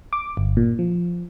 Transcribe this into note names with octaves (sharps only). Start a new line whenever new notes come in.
D6
G1
A#2
F3